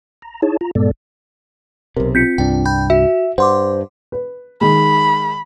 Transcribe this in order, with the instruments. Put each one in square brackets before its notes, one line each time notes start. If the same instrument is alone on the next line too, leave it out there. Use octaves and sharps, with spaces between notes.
[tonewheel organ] A#5
D#4 E4 G#4 C#5 A5
F4 A#5
G2 A#2 G#3 B3 A4 D5
[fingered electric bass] B1 C3 [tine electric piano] A#4
[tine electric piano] C4 F4 [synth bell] G6 B6 C#7
[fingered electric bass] C2 G2 D4 [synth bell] G5
[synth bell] G5 B5 G6
[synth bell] F#4 [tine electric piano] E5
[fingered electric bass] G2 [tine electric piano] C5 [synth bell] F#5 C6 D6
[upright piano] B4
[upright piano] D#3 G#3 [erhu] B5